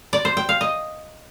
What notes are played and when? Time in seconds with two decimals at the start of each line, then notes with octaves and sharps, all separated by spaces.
0.13 D5
0.25 C5
0.37 G5
0.49 F5
0.61 D#5